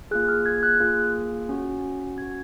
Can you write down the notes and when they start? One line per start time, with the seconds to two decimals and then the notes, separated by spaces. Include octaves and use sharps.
0.11 A#3 F4 G#4 F#6
0.29 F6
0.46 G#6
0.63 F#6
0.80 A#3 F4 G#4
1.49 C#4 F#4
2.17 C#4 G#6
2.22 F#4